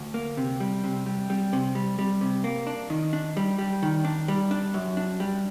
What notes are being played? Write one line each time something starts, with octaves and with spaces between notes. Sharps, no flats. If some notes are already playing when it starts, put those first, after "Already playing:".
Already playing: D2
A#3
C3
G3
C3
G3
G3
C3
G3
G3
C3
A#3
D4
D#3
D4
G3
G3
D#3
D4
G3
D4
F#2
D4
G3